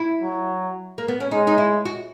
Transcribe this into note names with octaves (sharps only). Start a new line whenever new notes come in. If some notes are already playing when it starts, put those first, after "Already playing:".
Already playing: E4
F#3
A#3
B3
C#4
G#3 D#4
D#4
E4
F#4